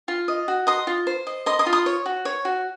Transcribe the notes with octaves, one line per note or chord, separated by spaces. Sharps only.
F4
D#5
F#4
D#5 C6 D#6
F4
C5
D#5
D#5 C6 D#6
C6 D#6
F4
C6 D#6
C#5
F#4
C#5
F#4